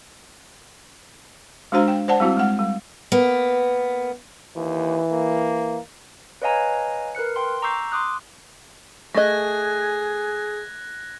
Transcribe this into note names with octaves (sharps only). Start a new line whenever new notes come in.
G#3 D4 F#4 C5 F5 A#5
G5
C5 D5 F#5 A5
G3 C4 E4 F#4
G#3 F#5
G3
A#3 B3
D#2 E3
A#3
B4 C#5 D#5 F5 G#5 A#5
A#4 B4 F#6 C#7
G5 C6
A#5 C#6 D6 E6 G6 C7
C6 D6 D#6 F#6
A3 G#4 D#5 F#6 G#6 A#6